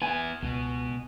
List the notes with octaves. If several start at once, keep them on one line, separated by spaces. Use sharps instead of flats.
B3 E4 G#5
C#2 B2 B3